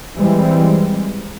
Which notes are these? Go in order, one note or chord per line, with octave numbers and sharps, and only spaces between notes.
E3 G3 G#3 C4